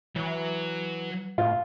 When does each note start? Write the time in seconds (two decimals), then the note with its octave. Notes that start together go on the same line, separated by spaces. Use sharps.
0.16 E3 F#3
1.38 A2 F4